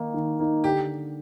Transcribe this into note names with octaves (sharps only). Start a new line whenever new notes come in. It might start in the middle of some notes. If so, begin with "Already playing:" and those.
Already playing: D#3 A#3 D#4
D#3
A#3 D#4
D3 G4